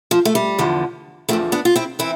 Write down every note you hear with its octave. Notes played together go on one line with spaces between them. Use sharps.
F3
A3
G3
E2 D3 F3
E2 D3 F3 A3 C4
B3 D4
F4
C4 E4
E3 C4 E4